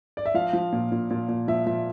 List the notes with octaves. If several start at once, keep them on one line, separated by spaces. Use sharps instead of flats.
D5
E5
F3 F5
F3
A#2
A#2
A#2
A#2
F3 E5
F3 E5